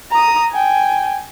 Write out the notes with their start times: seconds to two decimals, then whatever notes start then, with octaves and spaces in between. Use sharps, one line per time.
0.11 A#5 D#6
0.52 G5 G#5